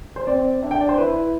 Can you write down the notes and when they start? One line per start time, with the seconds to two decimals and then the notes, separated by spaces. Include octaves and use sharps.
0.16 C5
0.27 C4 D5
0.63 D4 E5
0.71 G5
0.81 D5
0.89 C5
0.97 E4 B4